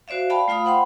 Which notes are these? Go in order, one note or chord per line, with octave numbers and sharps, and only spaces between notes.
F#4 C5 D5 E5 F5
D5 F5 G5 A5 B5
A3 F4 F5 B5 D#6
C5 F#5 G5 B5 C6